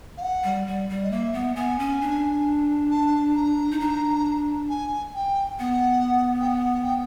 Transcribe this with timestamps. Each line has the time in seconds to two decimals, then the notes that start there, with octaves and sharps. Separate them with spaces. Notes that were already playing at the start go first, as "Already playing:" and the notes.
0.17 F5
0.22 F#5
0.44 G3
0.67 G3
0.89 G3
1.03 D#5
1.11 A#3 E5
1.33 B3
1.56 B3 G#5
1.79 C#4
2.01 D4
2.91 A5
3.35 A#5
3.71 D#4
3.80 D4
4.69 G#5
5.15 G5
5.59 B3 F#5
6.40 G5
6.49 F#5
6.83 G5